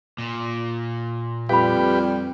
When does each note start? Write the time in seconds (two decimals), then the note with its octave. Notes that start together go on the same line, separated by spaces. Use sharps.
0.19 A#2
1.49 F2 G3 G4 B4 F5 G5 B5